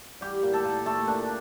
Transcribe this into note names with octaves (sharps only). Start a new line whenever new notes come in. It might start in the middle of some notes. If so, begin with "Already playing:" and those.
G3 G4
A#2
A4
A#2
A3 A4
A#2 D4